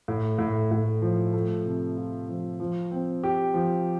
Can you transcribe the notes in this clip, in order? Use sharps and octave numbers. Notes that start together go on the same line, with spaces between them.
A2
A2
A2
F3
A3
C3
F4
F3
F3
C4
G4
F3